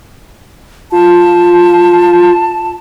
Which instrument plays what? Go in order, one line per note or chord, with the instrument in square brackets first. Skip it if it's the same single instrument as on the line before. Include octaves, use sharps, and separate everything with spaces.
[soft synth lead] F4 [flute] A5